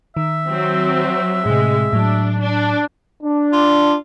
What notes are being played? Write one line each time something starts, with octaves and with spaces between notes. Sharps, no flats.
D#3 E5
F#3 C4
A2 C3 G#3
A2 F#3 D4
D4
D4
F4